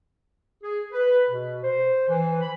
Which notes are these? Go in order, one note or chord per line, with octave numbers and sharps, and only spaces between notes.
G#4
B4
B2
C5
E3
B5